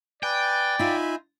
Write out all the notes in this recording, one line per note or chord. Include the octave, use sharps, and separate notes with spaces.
B4 D5 G5 G#5
D#4 F4 E5 G#5 B5